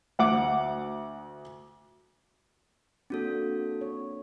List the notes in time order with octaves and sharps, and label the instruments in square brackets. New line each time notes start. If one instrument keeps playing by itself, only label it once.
[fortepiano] D2 F#5 D6
[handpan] A#3 D4 [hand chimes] C4 F#4 A4
[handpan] C#5